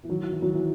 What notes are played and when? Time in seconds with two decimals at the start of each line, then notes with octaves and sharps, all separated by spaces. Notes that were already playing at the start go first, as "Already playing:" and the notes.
0.04 E3
0.09 D#3 F#3
0.21 E3
0.32 E3
0.42 D#3 F#3
0.54 E3